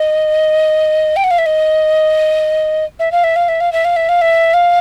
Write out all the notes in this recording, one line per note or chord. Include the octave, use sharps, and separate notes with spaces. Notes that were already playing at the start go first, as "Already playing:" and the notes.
Already playing: D#5
G5
F#5
F5
E5
D#5
E5
F5
E5
F5
E5
F5
E5
F5
E5
F5
E5
F5